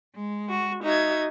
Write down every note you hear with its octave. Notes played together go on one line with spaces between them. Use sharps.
G#3
F#4
D#4 F#4 E5 G#6